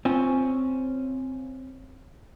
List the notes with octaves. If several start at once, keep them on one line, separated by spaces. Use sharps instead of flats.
C4 C#4 F4